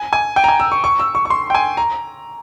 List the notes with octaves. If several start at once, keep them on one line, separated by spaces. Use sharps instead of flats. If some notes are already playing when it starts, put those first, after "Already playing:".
Already playing: G#5
G#5
G5
A#5
G#5
E6
C#6
C#6
E6
C#6
C#6
C6
G5
G#5
A#5